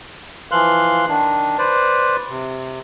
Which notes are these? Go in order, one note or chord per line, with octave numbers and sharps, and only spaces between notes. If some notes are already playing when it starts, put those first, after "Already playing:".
E3 F3 F5 C6 F#6
D#3 D4
B4 C5 D5
C3